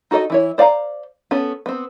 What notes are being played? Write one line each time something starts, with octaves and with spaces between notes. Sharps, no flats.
D#4 F#4 A4 D5 D#5
E3 E4 C#5
C5 D5 F5 G#5 A#5
B3 C#4 A4
B3 C4